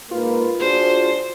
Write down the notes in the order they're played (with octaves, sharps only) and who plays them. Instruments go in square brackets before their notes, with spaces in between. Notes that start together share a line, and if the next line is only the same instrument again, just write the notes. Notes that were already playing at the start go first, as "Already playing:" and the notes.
[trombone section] G#2 A#3 B4 [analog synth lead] F4
[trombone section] D4 F#4 G#4 [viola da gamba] C5